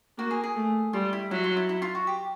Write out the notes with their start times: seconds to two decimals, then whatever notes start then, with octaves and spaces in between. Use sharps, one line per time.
0.18 A#3 F#4
0.31 G#4
0.44 G#4
0.55 A3
0.93 G3 F4
1.13 E4
1.31 F#3 E4
1.44 F4
1.57 E4
1.69 E4
1.82 F4
1.95 F#4
2.07 G4